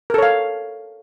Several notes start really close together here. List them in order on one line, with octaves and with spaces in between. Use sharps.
A#4 A4 C#5 F5